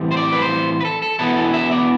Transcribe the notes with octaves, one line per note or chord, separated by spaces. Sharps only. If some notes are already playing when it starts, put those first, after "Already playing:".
Already playing: A2 E3 G3 C4
C5
D5
B4
C5
B4
A4
A4
E2 B2 B3 E4 A4
A4
E5
D5